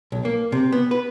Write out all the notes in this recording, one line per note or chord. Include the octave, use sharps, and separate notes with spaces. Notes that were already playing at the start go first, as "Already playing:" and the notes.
B1
A#3
C3
B3
B4